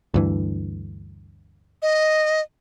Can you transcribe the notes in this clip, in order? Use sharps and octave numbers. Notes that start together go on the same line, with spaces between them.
D2 G2 E3
D#5